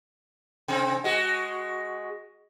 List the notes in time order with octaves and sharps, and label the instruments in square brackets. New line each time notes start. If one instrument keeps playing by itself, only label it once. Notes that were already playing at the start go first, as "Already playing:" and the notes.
[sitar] C3 C4
G#3 F#4